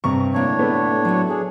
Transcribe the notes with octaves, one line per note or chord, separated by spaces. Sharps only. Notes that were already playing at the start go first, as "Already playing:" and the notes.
G2 C3 A#5 C#6
D2 A2 A#3 D4 C#5
A3 B3
F#3 F#4
D4 G#4